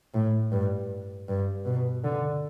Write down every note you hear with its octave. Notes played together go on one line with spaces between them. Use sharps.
A2
G2
G2
B2
D3